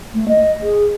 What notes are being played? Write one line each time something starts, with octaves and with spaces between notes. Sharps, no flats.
A3
D#5
G#4